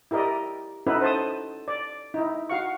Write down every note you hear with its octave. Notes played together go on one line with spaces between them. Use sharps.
E4 G4 A#4 D5 D#5
C#4 D#4 E4 F#4 A4 B4
C5 A5 D#6
D5
D#4 E4
F#4 F5 C#6